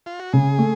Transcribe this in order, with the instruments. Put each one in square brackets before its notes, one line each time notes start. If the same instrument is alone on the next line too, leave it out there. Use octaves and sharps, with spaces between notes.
[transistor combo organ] F4
F#4
[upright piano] C#3 [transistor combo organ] G#4
[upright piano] A3